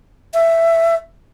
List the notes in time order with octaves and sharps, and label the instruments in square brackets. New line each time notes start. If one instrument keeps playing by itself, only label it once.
[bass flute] E5